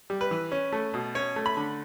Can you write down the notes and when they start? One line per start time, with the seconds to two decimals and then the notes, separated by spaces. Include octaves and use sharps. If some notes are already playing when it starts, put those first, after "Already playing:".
0.10 G3
0.21 B4
0.31 E3
0.52 C#4
0.72 A3
0.94 B2
1.15 C#4 C#5
1.36 A3
1.46 B5
1.57 D3